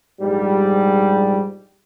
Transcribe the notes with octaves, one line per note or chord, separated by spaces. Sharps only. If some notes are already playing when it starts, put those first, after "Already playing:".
A#1 G#2 G3